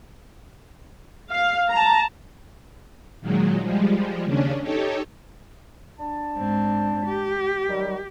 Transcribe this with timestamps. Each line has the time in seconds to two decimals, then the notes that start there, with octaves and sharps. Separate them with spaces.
1.33 F5
1.72 A5 A#5
3.21 A#2 D#3 F#3 G#3
3.61 F3 G3 G#3
4.24 D#2 C#3 C#4 D4
4.62 D#4 G4 A4 C#5
5.99 D4 A5
6.38 G#2 C4
7.06 G4
7.68 D#3 F#3 G3